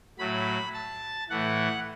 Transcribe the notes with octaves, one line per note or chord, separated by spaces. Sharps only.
A2 F#3 B5
A5
A2 E3 F#5